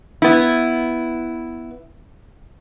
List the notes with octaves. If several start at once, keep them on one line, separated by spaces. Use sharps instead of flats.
B3 E4